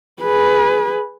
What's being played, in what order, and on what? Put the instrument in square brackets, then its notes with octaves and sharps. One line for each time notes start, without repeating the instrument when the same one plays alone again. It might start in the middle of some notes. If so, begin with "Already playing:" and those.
[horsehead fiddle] G#4 B4